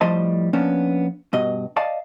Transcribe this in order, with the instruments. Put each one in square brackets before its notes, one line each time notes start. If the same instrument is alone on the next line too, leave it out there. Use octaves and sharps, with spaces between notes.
[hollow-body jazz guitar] A2 F3 G3 C5 D#5 A5
F3 A#3 B3 C#4 D4
G2 B2 D#5
D5 D#5 F5 A5